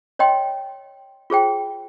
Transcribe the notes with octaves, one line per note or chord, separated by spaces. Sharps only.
C#5 D#5 G5 C6
F4 G#4 C5 G5